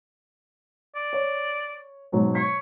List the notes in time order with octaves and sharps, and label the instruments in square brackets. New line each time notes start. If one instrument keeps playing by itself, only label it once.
[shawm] D5
[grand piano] C#5
G#2 B2 F#3
[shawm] C#5 [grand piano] B6